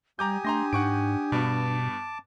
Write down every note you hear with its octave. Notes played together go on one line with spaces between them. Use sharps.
G3 G4 G#5 A#5 D6 D#6 G6
A3 D4 A#5 C6 A#6
G#2 F#5 C#6 D7
G2 B2 B3 A5 D6